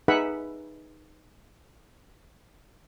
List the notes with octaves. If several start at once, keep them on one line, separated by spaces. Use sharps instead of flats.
D#4 G#4 B4 E5 F#5 B5